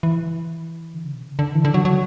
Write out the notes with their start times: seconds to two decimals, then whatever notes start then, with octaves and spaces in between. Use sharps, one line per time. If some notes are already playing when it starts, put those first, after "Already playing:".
0.03 E3
0.94 D3
1.04 C#3
1.14 B2
1.23 C#3
1.39 D3
1.55 E3
1.65 D3
1.74 F#3
1.85 F#3